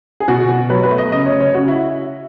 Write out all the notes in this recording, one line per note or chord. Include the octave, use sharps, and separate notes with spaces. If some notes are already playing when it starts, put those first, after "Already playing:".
G#4
B2 F#4
B2
F#3 B4
B4
A3
D#5
C#3 D#5
C#5
C#3
C#5
C#3 F#4
E4